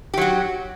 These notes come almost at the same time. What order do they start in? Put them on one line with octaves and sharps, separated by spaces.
G4 F#3 F#4